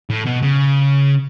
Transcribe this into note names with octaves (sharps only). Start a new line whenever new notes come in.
A2
B2
C#3